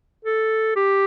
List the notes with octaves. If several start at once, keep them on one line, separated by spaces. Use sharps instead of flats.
A4
G4